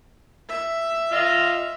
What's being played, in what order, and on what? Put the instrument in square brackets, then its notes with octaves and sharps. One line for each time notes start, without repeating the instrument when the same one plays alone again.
[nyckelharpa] E5
[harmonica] F4 D#5 F6